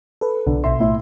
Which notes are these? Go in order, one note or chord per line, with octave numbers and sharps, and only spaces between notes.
A4 B4
B1 D3
A#1 B2 E5 C6
A2 E4